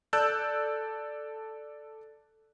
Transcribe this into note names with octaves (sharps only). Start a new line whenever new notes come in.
A4 D5 A5 E6 F#6 G6